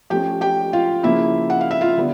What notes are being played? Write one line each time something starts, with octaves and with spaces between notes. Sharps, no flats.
F3 A3 C#4 G4 G5
G4 G5
F4 F5
C#3 F3 A#3 E4 E5
F#5
F5
E5
F4 F5
D3 G3 B3